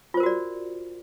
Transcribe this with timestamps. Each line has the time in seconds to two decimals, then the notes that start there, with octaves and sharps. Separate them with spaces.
0.14 F4
0.17 C5
0.20 A#4
0.23 F#4
0.26 D5